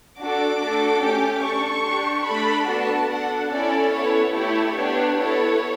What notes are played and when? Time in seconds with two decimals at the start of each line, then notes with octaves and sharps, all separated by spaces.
0.20 D4 F#4 A4 D6
0.61 A3 D4 F#4 A4
1.03 A3 C#4 G4
1.44 D4 A4 C#6
1.86 D4 G4
2.28 A3 D4 A4 B5
2.70 B3 D4 F#4 A4 A5
3.12 D4 A4 F#5
3.53 C#4 E4 A4 D5
3.94 B3 E4 A4 C#5
4.36 A3 E4 G4 C#5
4.77 B3 D4 G4
5.18 B3 E4 A4 C#5